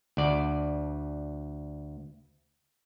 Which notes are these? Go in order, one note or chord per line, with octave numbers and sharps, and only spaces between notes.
D2 D5